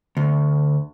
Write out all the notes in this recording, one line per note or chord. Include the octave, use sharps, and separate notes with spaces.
D2